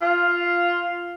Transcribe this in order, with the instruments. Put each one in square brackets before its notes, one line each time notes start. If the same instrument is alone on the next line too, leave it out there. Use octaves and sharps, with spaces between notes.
[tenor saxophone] F4